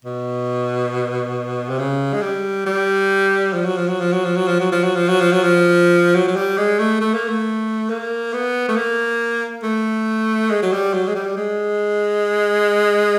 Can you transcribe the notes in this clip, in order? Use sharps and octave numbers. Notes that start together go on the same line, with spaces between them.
B2
C3
C#3
G#3
G3
G3
F3
F#3
F3
F#3
F3
F#3
F3
F#3
F3
F#3
F3
F#3
F3
F#3
F3
F#3
F3
F#3
F#3
G3
G#3
A3
A3
A#3
A3
A#3
B3
A3
A#3
A3
G#3
F#3
G3
F#3
G#3
G3
G#3